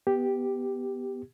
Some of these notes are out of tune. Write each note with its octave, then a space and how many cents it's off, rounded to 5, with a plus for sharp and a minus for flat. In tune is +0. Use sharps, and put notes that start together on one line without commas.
B3 +0 G4 +0